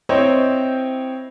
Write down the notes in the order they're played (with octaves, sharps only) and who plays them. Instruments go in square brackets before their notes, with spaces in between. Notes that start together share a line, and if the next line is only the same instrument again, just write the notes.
[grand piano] C4 E4 C5 C#5 D#5 G5